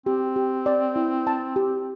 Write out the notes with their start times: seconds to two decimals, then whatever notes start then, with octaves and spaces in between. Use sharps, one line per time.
0.06 C4 G4
0.36 G4
0.66 D5
0.96 E4
1.27 A5
1.56 G4